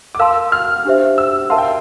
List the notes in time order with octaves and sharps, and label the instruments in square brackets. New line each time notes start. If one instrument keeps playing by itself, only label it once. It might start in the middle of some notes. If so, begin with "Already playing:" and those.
[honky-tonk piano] D6
[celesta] A#4 F5 A5 C6 [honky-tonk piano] E6
[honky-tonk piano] F6
[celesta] D4 G4 C5 E5
[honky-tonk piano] E6
[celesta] A#4 E5 A5 C6 [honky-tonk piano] F5
[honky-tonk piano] G5